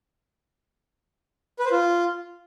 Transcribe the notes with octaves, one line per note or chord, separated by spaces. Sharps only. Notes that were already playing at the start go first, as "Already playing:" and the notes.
B4
C5
F4